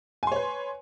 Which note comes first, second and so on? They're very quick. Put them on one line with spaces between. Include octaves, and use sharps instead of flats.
G#5 C6 C#5 B4